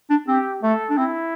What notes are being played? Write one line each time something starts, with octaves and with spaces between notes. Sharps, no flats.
D4
C4 G4
A3 A4
D4
C4 E4